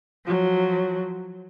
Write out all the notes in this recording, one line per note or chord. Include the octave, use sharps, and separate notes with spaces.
F3 F#3